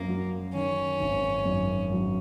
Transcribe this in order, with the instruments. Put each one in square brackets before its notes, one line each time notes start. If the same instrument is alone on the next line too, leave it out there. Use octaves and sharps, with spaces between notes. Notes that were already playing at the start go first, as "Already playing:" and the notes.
Already playing: [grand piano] F#2 [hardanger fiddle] A#3
[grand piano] F#3
[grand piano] D#3 [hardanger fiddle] C#4
[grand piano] G#1
F#2
F#3